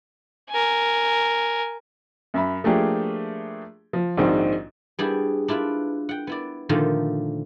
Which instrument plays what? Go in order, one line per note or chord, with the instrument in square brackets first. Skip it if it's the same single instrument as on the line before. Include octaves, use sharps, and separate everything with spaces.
[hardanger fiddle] A#4 G#5
[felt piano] F#2 E5 B5
F3 A3 A#3 D4 G4 G#4
F3
A#1 G#2 D#3 C4 F#4
[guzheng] G3 B3 D4 E4 G4 G#4
D4 E4 F4 B4
F#5 G5
B3 E4 D5
A#2 D3 D#3 F3 A3 F4